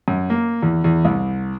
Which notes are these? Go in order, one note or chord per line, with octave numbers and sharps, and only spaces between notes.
F#2
A#3
E2
E2
C2